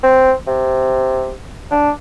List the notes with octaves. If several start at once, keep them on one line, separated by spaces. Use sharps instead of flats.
C4
C3
D4